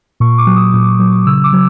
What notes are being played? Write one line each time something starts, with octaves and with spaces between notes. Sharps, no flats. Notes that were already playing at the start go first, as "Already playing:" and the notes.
A#2 C#6
D6
F#3
D#6
A#2
F#3
C#3 E6
D6
F#3